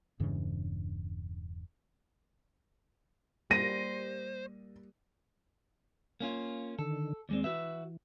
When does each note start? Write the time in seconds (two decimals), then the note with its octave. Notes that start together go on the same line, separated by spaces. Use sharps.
0.20 E1 G2 C#3 E3
3.51 G3 A#3 C5 A#6 D#7
6.20 A#3 C#4 F4
6.79 D3 D#3 A4
7.29 D#2 G#3 C4 D5
7.44 E3 F#4 B4 E5